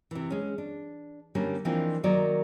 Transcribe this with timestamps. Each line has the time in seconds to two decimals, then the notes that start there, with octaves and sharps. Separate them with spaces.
0.11 C3 E3
0.30 G#3 C#4
0.58 D4
1.35 D3 G3 A3 A#3 C#4
1.65 E3 F3 A#3 C4 D4 D#4
2.04 D#3 F#3 A#3 D#4 D5